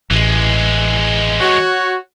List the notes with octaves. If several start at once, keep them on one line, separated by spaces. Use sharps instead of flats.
A1 E3 G#3
F#4 C#5